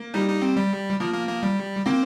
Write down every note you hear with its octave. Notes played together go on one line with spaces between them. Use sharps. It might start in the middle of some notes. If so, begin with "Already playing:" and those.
Already playing: A#3
G3 D#4
D#4
C4
G3
F3 A#3
A#3
A#3
G3
A#3 C4